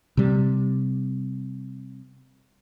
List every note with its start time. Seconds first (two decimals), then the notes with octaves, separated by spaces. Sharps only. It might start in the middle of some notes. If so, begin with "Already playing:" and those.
0.17 C3 G3